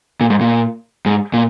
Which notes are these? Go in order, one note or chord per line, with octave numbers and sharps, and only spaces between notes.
A#2
G#2
A#2
G#2
A#2